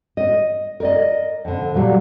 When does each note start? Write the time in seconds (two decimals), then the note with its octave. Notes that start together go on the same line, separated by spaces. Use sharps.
0.17 D#5
0.80 A#4 D5 D#5
1.45 F2 D3
1.74 A#2 F#3 G3